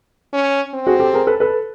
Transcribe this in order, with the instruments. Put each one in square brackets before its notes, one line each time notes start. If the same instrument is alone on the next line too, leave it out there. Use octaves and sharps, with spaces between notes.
[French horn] C#4
C4
[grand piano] F#4 G#4
G4 A4
G#4 A#4
A4 B4
A4 B4